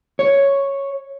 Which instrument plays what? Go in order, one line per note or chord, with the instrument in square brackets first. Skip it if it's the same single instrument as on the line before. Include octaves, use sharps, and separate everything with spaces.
[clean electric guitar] C#5